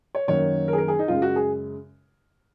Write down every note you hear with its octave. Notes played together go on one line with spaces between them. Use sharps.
C#5
F#2 D#3 F#3 A#3 C#5
A#4
G#4
A#4
G#4
D#4
F#2 C#3 G#3 F4
F#4
G#4